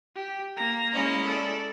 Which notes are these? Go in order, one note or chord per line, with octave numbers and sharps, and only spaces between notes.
G4
A#3 A#5
G#3 C#4 E4
A4 D5